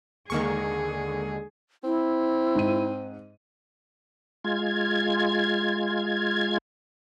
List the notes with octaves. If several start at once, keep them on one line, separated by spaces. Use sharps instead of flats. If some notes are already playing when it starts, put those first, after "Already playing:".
D#2 D3 D#3 G#3 A#3 G#4 C#6
C4 E4
G#2 D#7
G#3 F4 G#6